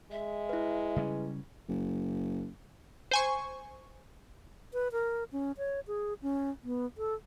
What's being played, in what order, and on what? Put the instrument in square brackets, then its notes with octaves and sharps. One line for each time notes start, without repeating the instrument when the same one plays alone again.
[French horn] G#3 [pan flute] E5
[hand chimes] E4 B4
[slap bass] C#3 G3 C#4
[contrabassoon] F#1
[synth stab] C5 G#5 C#6
[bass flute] B4
A#4
C#4
C#5
G#4
C#4
B3
A4